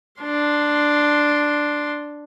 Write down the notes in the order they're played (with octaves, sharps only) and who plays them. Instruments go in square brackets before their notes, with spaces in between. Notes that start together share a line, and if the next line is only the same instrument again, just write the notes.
[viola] D4 C6